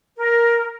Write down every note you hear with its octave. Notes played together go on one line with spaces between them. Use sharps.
A#4